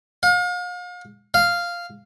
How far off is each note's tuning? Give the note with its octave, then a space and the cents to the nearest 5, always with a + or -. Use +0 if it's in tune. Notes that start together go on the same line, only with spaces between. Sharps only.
F5 +40
F5 -5